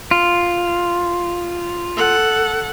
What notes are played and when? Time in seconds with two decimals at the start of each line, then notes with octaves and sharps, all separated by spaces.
0.11 F4
1.97 A4 F#5